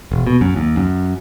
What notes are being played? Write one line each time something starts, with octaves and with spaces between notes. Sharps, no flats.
E1
B2
F#2
D#2
F#2